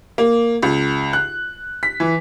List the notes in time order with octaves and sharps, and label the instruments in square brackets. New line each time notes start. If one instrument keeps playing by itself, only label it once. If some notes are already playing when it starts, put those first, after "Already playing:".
[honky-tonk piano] A#3
C#2
F#6
B6
E3